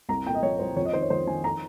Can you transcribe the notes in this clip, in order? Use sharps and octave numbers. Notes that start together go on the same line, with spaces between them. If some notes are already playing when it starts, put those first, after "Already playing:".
C2 A#5
A#2 G5
D#5
F3 C#5
C2 C5
F2 C#5
D#5
D#3 C5
C#5
F2 C5
D#3 G#5
A#5